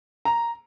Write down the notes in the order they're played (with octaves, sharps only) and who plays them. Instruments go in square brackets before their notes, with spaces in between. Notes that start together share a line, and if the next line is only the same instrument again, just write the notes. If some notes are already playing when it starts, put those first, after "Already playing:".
[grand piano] A#5